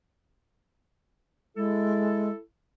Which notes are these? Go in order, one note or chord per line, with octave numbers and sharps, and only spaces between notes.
G#3 E4 A4